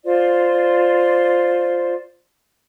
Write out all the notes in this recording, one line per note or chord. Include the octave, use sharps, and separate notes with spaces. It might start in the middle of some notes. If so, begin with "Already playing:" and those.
F4 C5 D5